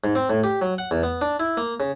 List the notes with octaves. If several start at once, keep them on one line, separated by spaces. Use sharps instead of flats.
G#2
C4
A2
G4
F#3
F#5
E2
B3
D4
E4
A#3
C#3